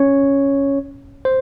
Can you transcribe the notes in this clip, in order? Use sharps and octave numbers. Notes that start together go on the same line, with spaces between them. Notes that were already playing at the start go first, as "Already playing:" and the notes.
Already playing: C#4 C#5
C5